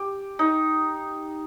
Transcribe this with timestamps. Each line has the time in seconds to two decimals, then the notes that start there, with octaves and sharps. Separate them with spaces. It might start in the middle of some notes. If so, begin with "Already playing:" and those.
Already playing: G4
0.39 D#4